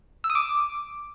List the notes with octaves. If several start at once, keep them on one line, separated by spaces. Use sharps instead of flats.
E6
D#6
D6